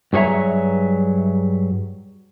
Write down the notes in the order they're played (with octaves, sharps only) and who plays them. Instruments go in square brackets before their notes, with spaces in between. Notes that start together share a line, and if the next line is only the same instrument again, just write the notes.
[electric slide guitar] G2 F#3 G#4 C#5 E5 A#5